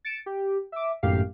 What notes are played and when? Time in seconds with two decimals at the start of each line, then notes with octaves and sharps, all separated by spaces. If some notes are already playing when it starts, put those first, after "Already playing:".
0.05 A6 C#7 D7 E7
0.26 G4
0.72 E5 D6
1.03 G#1 F#2 A2 G4 F5 C7